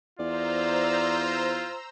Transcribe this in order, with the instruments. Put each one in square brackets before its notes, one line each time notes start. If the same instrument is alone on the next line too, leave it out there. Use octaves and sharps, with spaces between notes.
[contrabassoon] E2 [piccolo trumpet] F4 [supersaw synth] C5 A#5 E6 [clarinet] D5